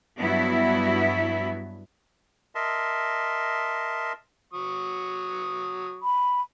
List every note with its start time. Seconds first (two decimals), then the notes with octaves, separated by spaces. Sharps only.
0.20 G2 F#3 B3 E4 F#4 E5
2.55 A#4 D#5 E5 A5 C6
4.53 F#3 C#6 D#6
6.03 B5